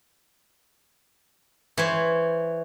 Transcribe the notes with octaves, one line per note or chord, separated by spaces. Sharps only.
E3 C5 C#5